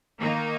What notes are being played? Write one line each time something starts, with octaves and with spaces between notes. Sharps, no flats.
D#3 A#3 D#4